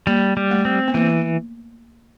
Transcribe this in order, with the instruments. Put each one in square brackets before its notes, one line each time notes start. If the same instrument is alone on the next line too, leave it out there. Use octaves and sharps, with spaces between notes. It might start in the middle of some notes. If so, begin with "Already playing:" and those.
[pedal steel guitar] G3 [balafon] A#3
[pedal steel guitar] G3
[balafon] A3
[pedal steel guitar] C4
[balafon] B3
[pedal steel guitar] E3 [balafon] A#3